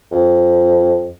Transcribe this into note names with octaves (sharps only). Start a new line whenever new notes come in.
F2